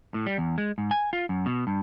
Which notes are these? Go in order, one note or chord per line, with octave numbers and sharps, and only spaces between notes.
A2
G3
E2
G#3
G#2
G#5
F4
F#2
B2
G2